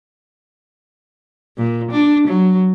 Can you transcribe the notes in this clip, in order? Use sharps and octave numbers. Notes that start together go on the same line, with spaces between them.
A#2
D4
F#3